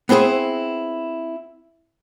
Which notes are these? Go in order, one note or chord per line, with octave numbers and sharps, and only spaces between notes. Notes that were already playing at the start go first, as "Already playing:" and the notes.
B3 C4 E4 G#4 C5